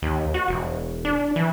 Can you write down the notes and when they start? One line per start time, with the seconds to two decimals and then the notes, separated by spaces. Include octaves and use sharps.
0.02 D#2
0.34 F#4
0.48 E1
1.05 D4
1.36 E3